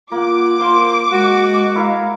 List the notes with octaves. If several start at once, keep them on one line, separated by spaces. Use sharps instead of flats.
A#3 F4 F#5 D6
A#3 C5 C6
G#3 F#4
E4 A#4 F5